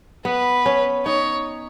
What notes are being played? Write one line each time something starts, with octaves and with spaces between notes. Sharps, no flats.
B3 B4
C#4
D#4 C#5